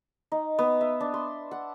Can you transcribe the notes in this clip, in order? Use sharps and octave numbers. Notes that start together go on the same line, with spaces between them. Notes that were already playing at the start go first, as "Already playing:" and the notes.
D#4
B3
E5
D4
C6
F#5